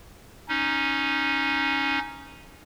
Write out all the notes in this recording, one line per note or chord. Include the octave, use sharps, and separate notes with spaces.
C#4 D#4